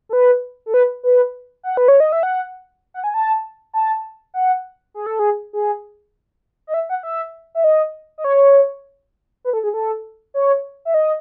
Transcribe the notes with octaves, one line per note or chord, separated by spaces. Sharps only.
A4
B4
A4
B4
B4
F#5
B4
C#5
D#5
E5
F#5
F#5
G#5
A5
A5
F#5
G#4
A4
G#4
G#4
D#5
E5
F#5
E5
E5
D#5
D#5
C#5
B4
A4
G#4
A4
C#5
E5
D#5